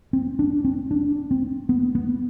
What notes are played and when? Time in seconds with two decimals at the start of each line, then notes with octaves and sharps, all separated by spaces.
0.13 C4
0.39 D4
0.65 C4
0.91 D4
1.31 C4
1.69 B3
1.95 B3